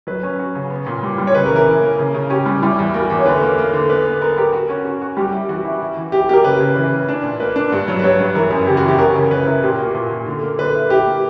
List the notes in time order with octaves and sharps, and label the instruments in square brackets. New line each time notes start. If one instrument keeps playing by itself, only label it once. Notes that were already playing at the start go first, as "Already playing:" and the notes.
[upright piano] F#3 [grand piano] B4
[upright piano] C#4
F#4
C#3
B3
A#2
G3
G3
[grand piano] C#5
[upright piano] C#3 [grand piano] B4
[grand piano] A#4
[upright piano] E3
[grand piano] A#4
[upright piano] E3
A#3
C#3
C#3
[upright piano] C#4 [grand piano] G4
[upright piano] G3
[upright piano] G3 [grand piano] E4
[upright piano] E2
[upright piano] A#3 [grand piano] F#4
[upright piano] E2
[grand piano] C#5
[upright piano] D3 [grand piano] B4
[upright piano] A#3
A#3
D3
[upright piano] B3 [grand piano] B4
[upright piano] B3
[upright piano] B3 [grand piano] A#4
[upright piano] G4 [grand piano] A#4
[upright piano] F#4
C#4
F#4
F#4
[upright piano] G3 [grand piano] G4
[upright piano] E4
[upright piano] E3 [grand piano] F#4
[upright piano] E4
E4
E3
[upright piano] E4 [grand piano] G4
[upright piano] A#3 [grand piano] G4
[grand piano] A#4
[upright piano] C#3 [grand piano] B4
[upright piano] C#3
[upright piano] E3 [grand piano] B4
[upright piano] E3
D4
A#2
[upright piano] A#3 [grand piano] B4
[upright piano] D4
G2
F#3
[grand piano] B4
[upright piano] G2 [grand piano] C#5
[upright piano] G2
[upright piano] E3 [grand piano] A#4
[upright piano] F#2
[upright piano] C#3 [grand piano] G4
[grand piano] F#4
[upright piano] E3 [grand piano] G4
[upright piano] B3 [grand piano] A#4
[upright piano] C#3
[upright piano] C#3 [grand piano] B4
[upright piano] E4 [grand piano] A#4
[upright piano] A#2 [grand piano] G4
[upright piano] A#3 [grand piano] F#4
[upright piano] A#2
A#2
D3
A#3
[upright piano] D3 [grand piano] B4
[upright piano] E4
[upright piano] E4 [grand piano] G4
[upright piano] A#3